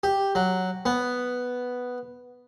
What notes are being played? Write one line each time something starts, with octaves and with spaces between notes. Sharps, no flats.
G4
F#3
B3